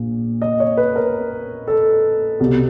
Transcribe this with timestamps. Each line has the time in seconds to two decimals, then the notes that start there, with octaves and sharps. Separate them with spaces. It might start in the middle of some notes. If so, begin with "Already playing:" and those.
Already playing: A#1 A#2
0.42 D#5
0.60 C#5
0.77 B4
0.96 A#4
1.67 A4
2.40 C2 B2